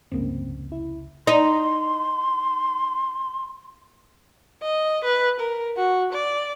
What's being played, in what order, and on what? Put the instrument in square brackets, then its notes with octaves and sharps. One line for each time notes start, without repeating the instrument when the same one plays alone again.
[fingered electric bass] F1 C#2 C#4 [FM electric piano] G2 A#3 C4
[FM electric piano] E4
[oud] D#4 [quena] C6
[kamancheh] D#5
B4
A#4
F#4
D5